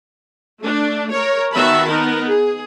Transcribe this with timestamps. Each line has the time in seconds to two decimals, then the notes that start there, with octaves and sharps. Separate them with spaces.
0.61 A3 D4
1.11 A#4 C#5
1.53 D#3 B3 F#4 E5 A5 B5
1.89 B3 D#4 A#4
2.27 G#4